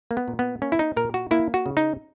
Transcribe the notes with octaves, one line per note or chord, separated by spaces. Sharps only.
A#3
B3
A#2
B3
A#3 C#4
E4
D#4
A#2 A#4
F#4
A#3 E4
F#4
C#3
D#4